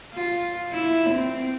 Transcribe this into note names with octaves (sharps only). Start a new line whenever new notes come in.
F4
E4
C4